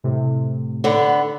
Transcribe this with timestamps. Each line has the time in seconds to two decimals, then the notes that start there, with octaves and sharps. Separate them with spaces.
0.04 A2 C3
0.84 D3 B3